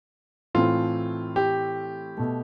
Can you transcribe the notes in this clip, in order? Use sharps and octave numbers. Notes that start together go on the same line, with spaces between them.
A2 E3 A3 C4 F4
G4
B2 A3